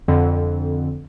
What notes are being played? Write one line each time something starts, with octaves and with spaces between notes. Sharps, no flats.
F2 D3